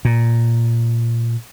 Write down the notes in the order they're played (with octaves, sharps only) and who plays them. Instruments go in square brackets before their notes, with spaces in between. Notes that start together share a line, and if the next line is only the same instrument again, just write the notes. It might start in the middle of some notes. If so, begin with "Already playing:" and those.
[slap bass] A#2